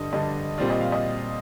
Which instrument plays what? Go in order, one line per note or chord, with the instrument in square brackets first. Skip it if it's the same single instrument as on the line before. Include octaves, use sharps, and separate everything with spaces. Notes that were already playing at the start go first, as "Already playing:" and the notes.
Already playing: [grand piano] G2 D3 G3 [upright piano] D#5
[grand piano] G2 D3 G3 [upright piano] D#5
[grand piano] A#2 G3 C4 F4 [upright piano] D5
[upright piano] D#5
F5
D#5